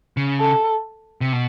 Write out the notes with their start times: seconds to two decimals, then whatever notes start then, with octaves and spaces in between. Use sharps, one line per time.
0.17 C#3
0.40 A4
1.21 C3
1.33 B2